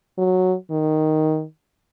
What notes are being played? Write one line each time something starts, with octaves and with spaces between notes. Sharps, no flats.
F#3
D#3